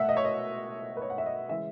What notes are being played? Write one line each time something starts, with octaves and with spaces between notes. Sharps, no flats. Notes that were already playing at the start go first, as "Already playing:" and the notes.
Already playing: B2 A3 E5 F#5
D#5
C#5
D#5
B4
C#5
F#5
E5
D#5
C#3 E3 G#3 E5